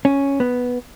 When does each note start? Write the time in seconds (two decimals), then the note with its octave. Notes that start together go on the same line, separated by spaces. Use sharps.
0.05 C#4
0.40 B3